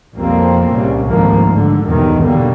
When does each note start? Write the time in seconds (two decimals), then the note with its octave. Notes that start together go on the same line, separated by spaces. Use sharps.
0.15 B1 F2 F3 G3 A#3 C4
0.72 C2 A#2 C#3 G3
1.06 G#1 D2 G#2 F3 A#3
1.49 G#2 D3
1.86 B1 E2 G2 D#3 G#3
2.22 B2 D3 G3 A#3